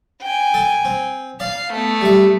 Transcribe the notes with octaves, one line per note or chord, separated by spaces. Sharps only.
G5 G#5
A4
C4
D5 F5
A3 B3
G3 E5